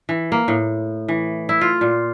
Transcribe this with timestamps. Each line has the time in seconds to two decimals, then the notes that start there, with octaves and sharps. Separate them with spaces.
0.09 E3
0.32 A#3
0.48 A2
1.08 E3
1.49 E4
1.61 F4
1.81 A#2